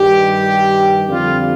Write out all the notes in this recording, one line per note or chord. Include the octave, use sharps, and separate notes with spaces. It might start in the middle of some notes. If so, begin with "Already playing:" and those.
Already playing: G2 D#3 G3 G4
F2 D3 G3 F4